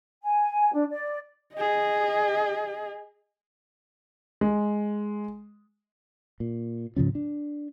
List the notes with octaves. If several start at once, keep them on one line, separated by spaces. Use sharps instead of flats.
G#5
D4
D5
G#4 D#5
G#3
A#2
G#2 C#3 F3 C#4
D4